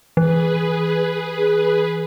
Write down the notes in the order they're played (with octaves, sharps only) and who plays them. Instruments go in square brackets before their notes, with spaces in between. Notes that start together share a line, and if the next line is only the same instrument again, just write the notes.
[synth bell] E3 [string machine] G#4 B4